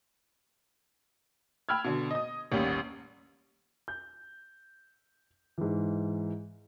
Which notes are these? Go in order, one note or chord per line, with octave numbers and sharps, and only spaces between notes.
G5 B5 E6 F6 G#6
B2 D3
D#5 D#6
A1 D#2 G3 C#4
G6
G#2 E3